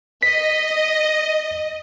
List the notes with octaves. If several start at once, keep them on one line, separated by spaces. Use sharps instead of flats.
D#5 B6